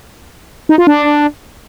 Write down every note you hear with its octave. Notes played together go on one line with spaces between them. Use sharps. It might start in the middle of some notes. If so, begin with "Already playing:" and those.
D#4
F4
D4